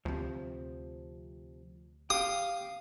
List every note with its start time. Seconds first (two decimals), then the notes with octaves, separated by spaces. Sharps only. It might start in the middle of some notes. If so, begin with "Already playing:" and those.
0.05 D2 C3 F3
2.10 G4 F5 D#6